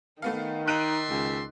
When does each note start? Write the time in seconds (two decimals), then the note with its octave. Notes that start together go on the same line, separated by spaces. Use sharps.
0.22 D#3 A3 B3 F5
0.68 D#4 D5 E5 C6 F#6 D7 D#7
1.10 C#2